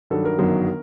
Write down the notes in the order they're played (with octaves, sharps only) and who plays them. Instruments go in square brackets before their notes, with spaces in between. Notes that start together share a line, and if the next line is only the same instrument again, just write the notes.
[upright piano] G2 D#3 F#3 A4
A#4
G1 F#2 D#3 F#3